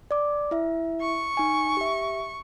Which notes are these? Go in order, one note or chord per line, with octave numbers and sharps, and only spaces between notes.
D5 D6
E4 E5
C#6
D#4 G#5
G4 E5